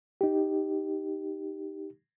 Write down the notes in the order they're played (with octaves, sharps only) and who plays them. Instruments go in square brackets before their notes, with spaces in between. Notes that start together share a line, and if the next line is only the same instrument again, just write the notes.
[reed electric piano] D#4 G4